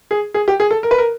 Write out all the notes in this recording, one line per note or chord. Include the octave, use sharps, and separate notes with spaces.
G#4
G#4
G4
G#4
A4
A#4
B4
A#4